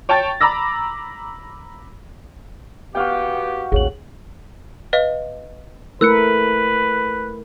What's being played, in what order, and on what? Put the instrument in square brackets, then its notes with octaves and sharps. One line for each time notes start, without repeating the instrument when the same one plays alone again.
[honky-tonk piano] C#5 G5 A5 C#6 A6
A#5 B5 D6 E6 A#6
[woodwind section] B3 G4 [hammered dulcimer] F#4 F5 G5
[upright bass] A1 D#2 [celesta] G#4 C#5 F#7
[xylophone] B4 D#5 F5
[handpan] A3 E4 A#4 [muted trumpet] B4 [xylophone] E6 F#6 C#7